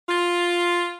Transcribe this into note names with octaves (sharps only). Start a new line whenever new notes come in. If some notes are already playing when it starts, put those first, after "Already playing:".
F4